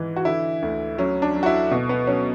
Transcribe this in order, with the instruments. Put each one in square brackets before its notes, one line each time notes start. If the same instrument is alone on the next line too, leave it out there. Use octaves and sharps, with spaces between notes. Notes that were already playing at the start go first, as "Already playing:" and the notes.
Already playing: [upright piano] G#2 E3
F#4
D3 E4
D2
F#3 C#4
D4
F#3
F#4
E4
B2
B3
F#3 C#4